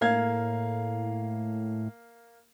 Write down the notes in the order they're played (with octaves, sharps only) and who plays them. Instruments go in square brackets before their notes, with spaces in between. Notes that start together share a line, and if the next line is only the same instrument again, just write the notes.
[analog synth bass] A2 [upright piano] A#3 F5 G#6